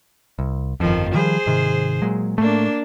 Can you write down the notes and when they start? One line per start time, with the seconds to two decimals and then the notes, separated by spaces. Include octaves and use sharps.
0.39 C2
0.80 G1 F2 D#3 F3
1.14 D#3 F3 G3 G#4 C5
1.46 G#2 C3 D#3
2.02 A#2 F#3 G#3
2.38 A2 A3 A#3 D4